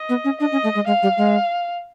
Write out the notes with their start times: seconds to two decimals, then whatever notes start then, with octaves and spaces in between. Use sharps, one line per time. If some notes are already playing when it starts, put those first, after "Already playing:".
Already playing: D#5
0.09 B3
0.24 C#4
0.40 D4 D#5
0.52 C#4
0.64 A3
0.75 G#3
0.87 G#3 F5
1.03 G3
1.17 G#3